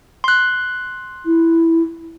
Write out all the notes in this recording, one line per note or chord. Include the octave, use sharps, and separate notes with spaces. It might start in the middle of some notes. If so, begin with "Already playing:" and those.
C6 F#6
E4